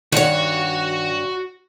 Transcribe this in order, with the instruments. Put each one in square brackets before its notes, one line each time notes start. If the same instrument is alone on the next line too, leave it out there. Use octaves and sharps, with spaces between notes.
[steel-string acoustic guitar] G2 C#5 [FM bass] D#3 [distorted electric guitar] F#4 F#5